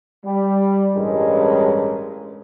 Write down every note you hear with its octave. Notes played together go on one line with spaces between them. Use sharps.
G3
A1 G2 G#3 C#4 A#4